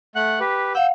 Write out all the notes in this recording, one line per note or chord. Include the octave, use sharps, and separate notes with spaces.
A3 F#5 F#6
G4 B4
F5 F#5 E6 G6